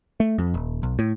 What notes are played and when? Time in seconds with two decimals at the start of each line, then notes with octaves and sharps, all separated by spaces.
0.20 A3
0.38 F2
0.54 D#1
0.83 B1
0.99 A2